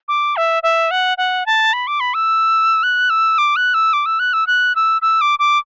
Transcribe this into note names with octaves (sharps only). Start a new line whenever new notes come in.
D6
E5
E5
F#5
F#5
A5
B5
D6
B5
E6
F#6
E6
D6
F#6
E6
D6
E6
F#6
E6
F#6
E6
E6
D6
D6